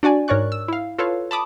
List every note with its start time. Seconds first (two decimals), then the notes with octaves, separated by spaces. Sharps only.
0.03 D4 F#4 D5 G#5
0.28 G#2 A#4 C#5 D5 C#6 F#6
0.52 E6
0.68 E4 F5
0.98 F4 A4 B4 C#5 F5
1.31 A5 B5 D6 D#6